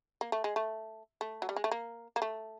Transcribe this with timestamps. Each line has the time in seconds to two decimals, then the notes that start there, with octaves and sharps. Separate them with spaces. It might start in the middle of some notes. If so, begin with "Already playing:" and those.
0.21 A#3
0.32 A3
0.44 G#3
0.56 A3
1.21 A3
1.42 F#3
1.49 G3
1.56 G#3
1.64 A3
1.71 A#3
2.16 A#3
2.22 A3